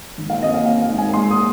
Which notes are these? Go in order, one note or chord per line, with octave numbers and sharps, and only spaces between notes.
G#1
F5
C4 D#5
F5
C4 F5
F5
G#2
G#5
G#3 C6
D#6